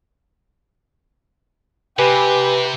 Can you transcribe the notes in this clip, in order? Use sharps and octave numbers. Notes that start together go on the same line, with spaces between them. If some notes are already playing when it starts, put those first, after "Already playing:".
C3 G4 B4 G#5